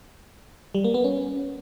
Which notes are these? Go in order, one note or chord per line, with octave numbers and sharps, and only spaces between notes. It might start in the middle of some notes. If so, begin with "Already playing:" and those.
G3
A#3
B3
C#4